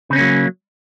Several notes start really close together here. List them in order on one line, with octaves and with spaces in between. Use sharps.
C#3 C4 C#4 A#3 F#3